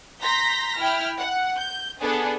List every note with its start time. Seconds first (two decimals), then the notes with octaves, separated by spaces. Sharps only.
0.22 A#5 C6 G6 A#6 B6
0.79 E4 G5 F6
1.18 F#5
1.56 G6
1.99 B3 D4 G#4 A4